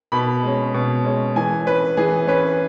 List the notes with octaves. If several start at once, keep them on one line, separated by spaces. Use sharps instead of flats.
B2 B5
G#3 C#4
B2
G#3 C#4
E3 G#5
C#4 B4
E3 G#4
C#4 B4